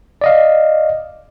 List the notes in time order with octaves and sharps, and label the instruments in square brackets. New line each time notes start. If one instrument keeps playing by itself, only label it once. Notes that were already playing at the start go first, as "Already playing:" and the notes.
[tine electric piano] D5 D#5 F5